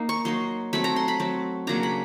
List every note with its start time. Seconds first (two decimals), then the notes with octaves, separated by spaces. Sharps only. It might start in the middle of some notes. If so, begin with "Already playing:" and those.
Already playing: A#3 D#4
0.09 C#6
0.25 F#3 A#3 D#4 C6
0.73 F#3 A3 C4 B5
0.84 A#5
0.96 C6
1.08 B5
1.20 F#3 A3 C4
1.67 C#3 F#3 A#3 D4 A#5
1.83 B5